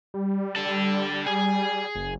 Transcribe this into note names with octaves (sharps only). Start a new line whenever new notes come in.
G3
D4 A4
G#4 G#5
F#1